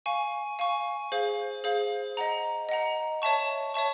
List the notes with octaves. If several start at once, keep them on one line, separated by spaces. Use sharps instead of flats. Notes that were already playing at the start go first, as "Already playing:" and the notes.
F5 G#5 C#6
F5 G#5 C#6
G#4 C5 F5
G#4 C5 F5
D#5 F#5 A#5
D#5 F#5 A#5
C#5 E5 A5 C#6
C#5 E5 A5 C#6